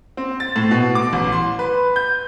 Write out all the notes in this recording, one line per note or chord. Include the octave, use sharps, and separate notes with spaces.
C4
A6
A2
B2
D6
A1
C6
B4
G6